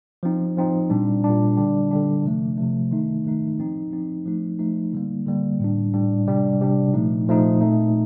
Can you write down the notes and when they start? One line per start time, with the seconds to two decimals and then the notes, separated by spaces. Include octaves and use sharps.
0.23 F3 C4 D#4
0.57 F3 C4 D#4
0.90 A#2 G3 D4
1.24 A#2 G3 D4
1.57 D3 G3 D4
1.91 D3 G3 D4
2.24 C3 F3 A3
2.58 C3 F3 A3
2.91 D#3 A3 D#4
3.25 D#3 A3 D#4
3.59 F3 C4 D#4
3.92 F3 C4 D#4
4.26 F3 A3 D#4
4.59 F3 A3 D#4
4.93 D3 G3 A#3
5.27 D3 G3 A#3
5.60 A2 G3 D4
5.93 A2 G3 D4
6.27 C3 G3 D4
6.61 C3 G3 D4
6.94 A#2 F3 A3 D#4
7.28 A#2 F3 A3 D#4
7.61 A#2 A3 C4 D#4